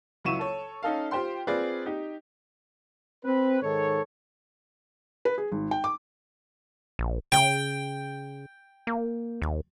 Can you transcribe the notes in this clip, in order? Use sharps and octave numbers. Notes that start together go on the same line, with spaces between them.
C#2 F#3 E4 C#6 D#7 E7
A4 C#5
C#4 D#4 A4 F5
F4 G4 C5 G5 C6
C4 F4 G#4 B4 D5
D#4 G4
C4 B4
G#2 D#3 A4 C#5
B4
G#4
G#1
G5
D6
A#1
C#3 G5
A#3
D#2